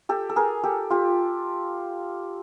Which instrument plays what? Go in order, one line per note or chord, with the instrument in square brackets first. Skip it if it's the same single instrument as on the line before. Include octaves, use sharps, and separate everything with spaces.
[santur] G4 A4
A4
G#4 A#4
G4 A4
F4 G4